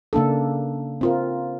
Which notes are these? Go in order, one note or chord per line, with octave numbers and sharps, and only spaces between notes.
C#3 A#3 D4 A4
C4 F4 A#4